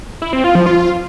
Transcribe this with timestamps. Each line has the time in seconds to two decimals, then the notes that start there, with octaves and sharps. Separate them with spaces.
0.22 E4
0.33 C4
0.44 F4
0.55 F3
0.66 F4